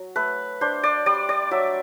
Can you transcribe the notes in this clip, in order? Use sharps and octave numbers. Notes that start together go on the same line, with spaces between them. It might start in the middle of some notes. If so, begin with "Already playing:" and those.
Already playing: F#3
A3 B4
D4 C5
D5
G3 D5
D5
F#3 E5